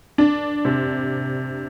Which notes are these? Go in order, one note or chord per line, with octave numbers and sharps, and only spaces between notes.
D4
C3